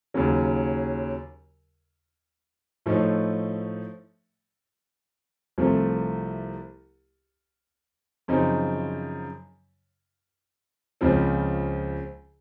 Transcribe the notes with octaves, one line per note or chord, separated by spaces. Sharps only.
D#2 C#3 F#3
A2 F3 A3 D#4
C2 C3 F3 A3
F#2 C#3 F3 C4 D#4
C#2 C#3 F3 C4